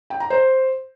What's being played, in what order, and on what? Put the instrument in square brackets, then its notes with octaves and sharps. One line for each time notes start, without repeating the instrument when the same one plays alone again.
[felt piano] G5
A#5
C5